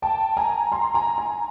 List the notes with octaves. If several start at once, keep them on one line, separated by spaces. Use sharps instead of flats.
G5 A5
G#5 A#5
A#5 C6
G#5 A#5
G#5 A#5